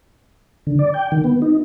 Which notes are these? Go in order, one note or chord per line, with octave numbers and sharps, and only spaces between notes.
D3
D5
G5
D#3
B3
D#4